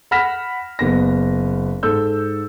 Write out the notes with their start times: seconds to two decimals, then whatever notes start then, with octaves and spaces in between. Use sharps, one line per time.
0.11 F#5 B5 F6 A#6 B6 E7
0.79 F#1 B3 A#6
1.83 G#2 A4 E6 G6